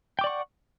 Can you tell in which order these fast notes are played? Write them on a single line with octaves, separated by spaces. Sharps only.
G5 D6 D5 C#6 F#5